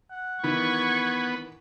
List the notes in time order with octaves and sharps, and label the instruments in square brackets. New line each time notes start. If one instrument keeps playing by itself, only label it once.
[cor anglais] F#5
[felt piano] D#3 E3 [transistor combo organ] B3 [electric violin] C#6 G#6